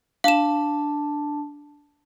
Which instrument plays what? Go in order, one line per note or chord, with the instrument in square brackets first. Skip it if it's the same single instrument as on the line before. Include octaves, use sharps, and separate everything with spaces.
[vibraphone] D4 A5 [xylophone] F5 E7